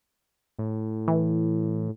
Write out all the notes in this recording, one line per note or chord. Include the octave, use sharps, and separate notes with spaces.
A2
E3